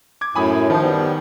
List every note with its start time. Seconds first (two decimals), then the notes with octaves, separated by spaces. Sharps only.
0.21 D6 G#6
0.36 F#2 A2 G#5 B5 D#6
0.70 D#3 F3
0.82 G3 B3